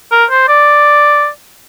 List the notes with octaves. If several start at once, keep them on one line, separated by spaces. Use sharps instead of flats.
A#4
C5
D5